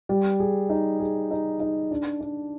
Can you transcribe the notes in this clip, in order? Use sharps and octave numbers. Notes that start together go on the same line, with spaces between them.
G3
G#4
D#4
G#4
D#4
D#4
D4
D4